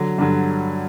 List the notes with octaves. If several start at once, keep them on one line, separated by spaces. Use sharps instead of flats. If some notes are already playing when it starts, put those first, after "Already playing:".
Already playing: D3 F#3
G2 D3 F#3